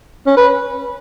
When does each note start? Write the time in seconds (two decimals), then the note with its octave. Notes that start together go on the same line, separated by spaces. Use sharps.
0.27 C#4
0.37 B4